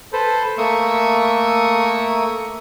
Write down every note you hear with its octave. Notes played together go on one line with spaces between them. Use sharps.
A4 B4 C5
A3 A#3 E5 C#6 D#6